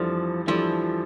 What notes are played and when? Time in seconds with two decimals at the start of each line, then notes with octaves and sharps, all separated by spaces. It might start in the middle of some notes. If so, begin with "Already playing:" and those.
Already playing: F2 E3 F3 G3 D4 A4
0.47 E3 F3 G3 D4 A4